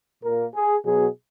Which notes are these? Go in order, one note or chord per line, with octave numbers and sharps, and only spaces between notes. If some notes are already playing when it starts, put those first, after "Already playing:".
A#2 A#3 A#4
G#4
B2 F#3 B3 G#4